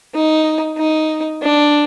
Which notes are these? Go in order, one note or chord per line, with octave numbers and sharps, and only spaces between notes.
D#4
D#4
D4